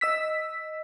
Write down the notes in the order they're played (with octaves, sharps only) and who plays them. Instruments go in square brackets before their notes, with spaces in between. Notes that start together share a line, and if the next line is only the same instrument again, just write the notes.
[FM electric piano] D#5 E6 B6